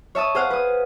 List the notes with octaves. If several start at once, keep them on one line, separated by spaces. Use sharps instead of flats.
C#5 E5 A5 D#6
G#4 C5 F5 F#5
B4 D#6